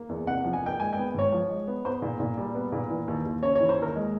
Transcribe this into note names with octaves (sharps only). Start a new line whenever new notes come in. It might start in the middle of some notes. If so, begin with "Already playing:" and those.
Already playing: A#3
E2
C3 F#5
F3
G#5
A#3 G5
G#3 G#5
B3 G5
G#2 C#5
F3
G#3
B3
B3 C5
A#2
A#2
G3
B3
A#2
E3
D#2
D#2
C#3 C#5
E3 C#5
C5
D#2 A#4
G#3